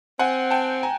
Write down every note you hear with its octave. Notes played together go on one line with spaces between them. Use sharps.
C4 F#5 G#5
G5 A5
G#5 A#5